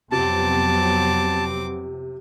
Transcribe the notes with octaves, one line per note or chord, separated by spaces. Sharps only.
F2 C3 F#3 B3 C4 F4 A5 D6